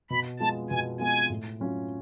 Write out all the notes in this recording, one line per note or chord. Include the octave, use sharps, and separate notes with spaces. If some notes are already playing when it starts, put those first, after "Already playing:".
B2 B5
G#3 B3 F4 A5
B2 G#5
G#3 B3 F4 G#5
A2
F#3 C#4 F4